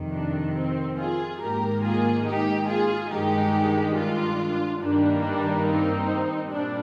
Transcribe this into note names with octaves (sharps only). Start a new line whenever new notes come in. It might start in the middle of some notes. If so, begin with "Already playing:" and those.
Already playing: F2 C3 D#3
D4
C4
F4 G#4
G#2 D#3 A#3 G4 A#4
F4 G#4
D#4 G4
F4 G#4
G2 D#3 G#3 D#4 G4
D4 F4
G2 D#3 G3 A#3 D4
D4
C4 D#4
A#2 G3 D4